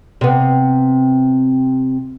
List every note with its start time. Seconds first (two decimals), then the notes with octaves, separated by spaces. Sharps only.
0.21 C3 B3